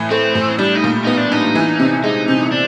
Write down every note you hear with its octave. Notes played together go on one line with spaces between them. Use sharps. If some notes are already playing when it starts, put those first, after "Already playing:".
Already playing: A2 E3
A3 C4
A2
G3 D4
D#4
A#2
B3 D#4
D4
D4 D#4
E3
C3
G#3 D#4
C3
D4